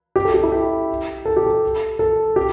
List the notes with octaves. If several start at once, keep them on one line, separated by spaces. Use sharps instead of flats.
G4
A4
G4
E4
G4
A4
G4
A4
A4
G4